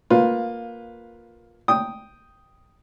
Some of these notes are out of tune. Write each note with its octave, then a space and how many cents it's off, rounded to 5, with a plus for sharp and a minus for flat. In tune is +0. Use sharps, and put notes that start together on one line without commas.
A#3 +0 F4 +15 B4 +0
G5 +0 D#6 +0